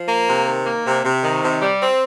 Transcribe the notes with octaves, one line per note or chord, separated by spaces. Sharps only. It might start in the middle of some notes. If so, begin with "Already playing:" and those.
Already playing: F3
A#3
C3
D#3
A#3
C3
C3
D#3
C3
G3
C4